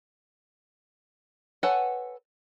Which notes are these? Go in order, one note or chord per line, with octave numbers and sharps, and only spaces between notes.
A4 B4 C#5 F#5 G#5